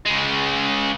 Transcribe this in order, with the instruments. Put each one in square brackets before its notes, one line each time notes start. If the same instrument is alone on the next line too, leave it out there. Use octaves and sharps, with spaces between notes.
[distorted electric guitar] C#3 G#3